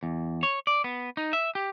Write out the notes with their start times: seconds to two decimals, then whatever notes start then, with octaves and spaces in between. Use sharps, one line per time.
0.03 E2
0.43 C#5
0.67 D5
0.84 B3
1.17 D#4
1.33 E5
1.55 G4